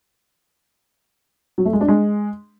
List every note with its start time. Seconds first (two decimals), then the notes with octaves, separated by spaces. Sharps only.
1.58 F#3
1.66 A3
1.73 G#3
1.81 D4
1.88 G#3